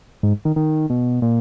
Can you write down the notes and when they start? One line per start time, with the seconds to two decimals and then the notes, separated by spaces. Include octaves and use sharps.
0.23 G#2
0.45 D#3
0.56 D#3
0.90 B2
1.22 A#2